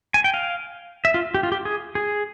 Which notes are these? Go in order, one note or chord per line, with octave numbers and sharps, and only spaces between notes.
G#5
G5
F5
E5
F4
G4
F4
G4
G#4
G#4